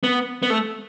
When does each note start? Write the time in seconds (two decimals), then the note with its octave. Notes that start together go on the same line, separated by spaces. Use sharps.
0.04 B3
0.43 B3
0.50 A3